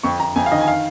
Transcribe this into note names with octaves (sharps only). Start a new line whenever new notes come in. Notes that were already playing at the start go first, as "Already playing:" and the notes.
F2 C#6
F2 A#5
F2 G#5
F5
D#3 D#5
G#5
F5